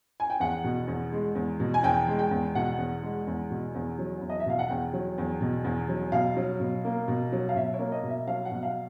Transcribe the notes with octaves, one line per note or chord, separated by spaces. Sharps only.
G#5
G5
E2 F#5
B2
E2
G#3
E2
B2
G#5
E2 G5
G#3
G5
E2
B2 F#5
E2
G#3
E2
B2
E2
F#3
E2
D#5
E5
B2 F5
F#5
E2 G5
F#3
E2
B2
E2
F#3
B2 F5
F#3
B2
A#3
B2
F#3
F5
B2 E5
C#5
A#3
D#5
B2
E5
F#3 F5
F#5
B2
F5